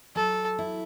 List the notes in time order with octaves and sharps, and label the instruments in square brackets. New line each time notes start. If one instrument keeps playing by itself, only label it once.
[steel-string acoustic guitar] F#3 [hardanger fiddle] A4
[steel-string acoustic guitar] E4